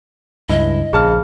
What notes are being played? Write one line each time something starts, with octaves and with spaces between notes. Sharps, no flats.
C#2 G2 E4 D#5
A#1 C#3 G#4 A5 F6